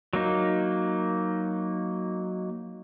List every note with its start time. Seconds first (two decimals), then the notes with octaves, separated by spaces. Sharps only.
0.13 F#3 A#3 D#4